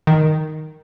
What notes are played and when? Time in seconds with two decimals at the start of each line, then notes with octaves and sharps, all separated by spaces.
0.07 D#3